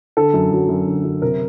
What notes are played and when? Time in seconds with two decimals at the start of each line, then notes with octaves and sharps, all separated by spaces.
0.17 D3 A4
0.34 F#2
0.52 F#3
0.69 F#2
0.87 D3
1.05 F#2
1.22 C3 A#4